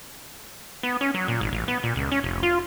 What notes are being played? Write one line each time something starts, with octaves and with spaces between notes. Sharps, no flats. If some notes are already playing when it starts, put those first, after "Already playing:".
B3
C#4
F#3
A#2
G#1
A1
B3
A#2
C#2
C#4
F1
F4